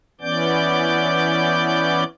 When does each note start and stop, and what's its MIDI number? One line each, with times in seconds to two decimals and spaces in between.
0.21 2.04 52
0.21 2.04 59
0.21 2.04 61
0.21 2.04 74
0.21 2.04 86
0.21 2.04 91